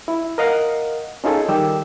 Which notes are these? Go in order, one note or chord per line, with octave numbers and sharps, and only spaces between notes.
E4
A#4 D#5 F5 F#5
C#4 D#4 F4 G#4 A4
D#3 G3 G4 E6